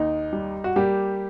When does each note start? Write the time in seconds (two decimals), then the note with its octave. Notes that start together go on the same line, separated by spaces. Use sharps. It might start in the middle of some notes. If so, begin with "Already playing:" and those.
Already playing: D#2 D#4
0.33 G3
0.64 F#4
0.76 G3 A#3 G4